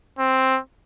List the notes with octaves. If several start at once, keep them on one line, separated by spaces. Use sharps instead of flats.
C4